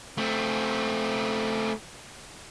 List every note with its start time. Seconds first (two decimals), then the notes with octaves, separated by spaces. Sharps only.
0.18 A3 C4